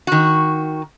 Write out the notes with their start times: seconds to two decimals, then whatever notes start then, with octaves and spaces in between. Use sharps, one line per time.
0.07 D#3 F#4